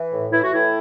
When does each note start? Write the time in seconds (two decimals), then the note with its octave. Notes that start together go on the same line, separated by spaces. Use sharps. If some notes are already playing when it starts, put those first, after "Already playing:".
Already playing: E3
0.12 A2
0.32 E3 E4
0.43 F#4
0.53 A2 E4